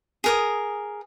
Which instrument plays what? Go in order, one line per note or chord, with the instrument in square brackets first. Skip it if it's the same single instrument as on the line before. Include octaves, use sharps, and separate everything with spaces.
[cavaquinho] G#4 A#4 D#6